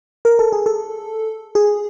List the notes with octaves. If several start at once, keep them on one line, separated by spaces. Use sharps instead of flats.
A#4
A4
G#4
A4
G#4